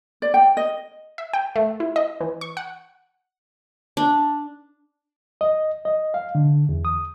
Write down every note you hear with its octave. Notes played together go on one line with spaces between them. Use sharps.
D5
G5
D#5
E5
G5
A3
E4
D#5
E3
C#6
F#5
D4
D#5
D#5
F5
D3
E2
D#6